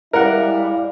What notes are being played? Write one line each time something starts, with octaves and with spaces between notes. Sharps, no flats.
G3 G#3 E4 A#4 D5 F5 F#5